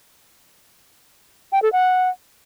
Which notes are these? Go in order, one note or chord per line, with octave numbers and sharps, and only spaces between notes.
G5
A4
F#5